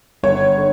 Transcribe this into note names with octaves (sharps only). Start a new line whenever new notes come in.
G1 C#5
D3